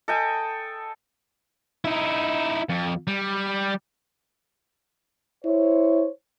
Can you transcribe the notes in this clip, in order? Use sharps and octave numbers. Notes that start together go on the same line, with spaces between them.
A4 D#5 G5 G#5
D#4 E4
F2
G3
E4 C5 C#5